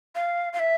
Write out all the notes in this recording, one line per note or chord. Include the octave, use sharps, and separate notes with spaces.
F5
F5
E5